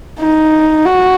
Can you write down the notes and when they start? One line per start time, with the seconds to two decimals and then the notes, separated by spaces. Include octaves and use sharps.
0.20 D#4
0.86 F#4